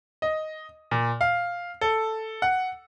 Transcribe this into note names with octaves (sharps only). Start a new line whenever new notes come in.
D#5
A#2
F5
A4
F#5